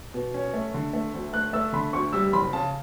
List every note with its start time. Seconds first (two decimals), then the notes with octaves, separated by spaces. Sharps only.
0.14 B2
0.34 C#4
0.54 A3
0.74 D3
0.93 A3
1.14 D2
1.33 A3 F#6
1.53 A3 E6
1.73 D3 B5
1.93 D2 C#6
2.13 G3 E6
2.32 F#1 B5
2.53 C#3 A5